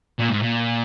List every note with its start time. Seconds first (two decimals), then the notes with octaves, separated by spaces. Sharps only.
0.19 A#2
0.30 G#2
0.42 A#2